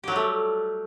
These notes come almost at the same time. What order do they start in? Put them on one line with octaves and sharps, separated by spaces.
G4 F#3 G3 A3